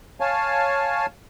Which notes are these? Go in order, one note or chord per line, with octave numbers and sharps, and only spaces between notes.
C#5 F5 G#5 A5